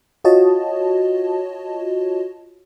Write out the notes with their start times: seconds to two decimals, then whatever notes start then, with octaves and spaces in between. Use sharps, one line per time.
0.24 F4 F#4 C#5 D#5 A5